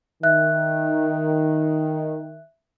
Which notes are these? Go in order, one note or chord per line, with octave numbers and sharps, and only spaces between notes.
D#3 E5 F#6